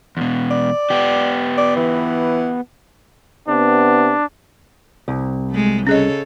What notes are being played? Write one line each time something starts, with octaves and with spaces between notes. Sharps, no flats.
E2 B2
D5
B3 G4
D5
E3
C3 B3 D4
C2
G#3 A3
C#3 C#4 G#4 A4 C#5 D#5